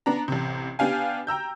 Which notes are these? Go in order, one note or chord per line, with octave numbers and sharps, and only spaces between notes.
B3 D4 A#5
A1 C3
B3 D4 G4 F5 G#5
G5 A#5 E6 G6